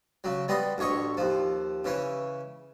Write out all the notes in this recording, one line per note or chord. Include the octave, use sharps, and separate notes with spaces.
C#3 F#3
G3 B3 D#5 C6
A1 D2 C#5 D#5 C#6
D#2 F3
C#3 E3 C#4